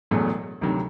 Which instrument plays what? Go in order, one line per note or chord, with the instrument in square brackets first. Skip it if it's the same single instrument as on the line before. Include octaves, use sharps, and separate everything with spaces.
[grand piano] E1 E2 B2 F#3 A3
D2 C3 D#3 F#3